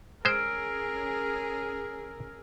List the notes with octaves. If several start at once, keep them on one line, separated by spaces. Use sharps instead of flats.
G#3 C#4 G#4 A#4 C5 E6 F6 D7